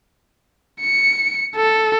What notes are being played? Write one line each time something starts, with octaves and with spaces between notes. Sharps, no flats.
C#7
A4